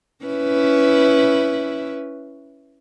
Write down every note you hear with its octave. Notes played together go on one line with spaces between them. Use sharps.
C#4 E4 B4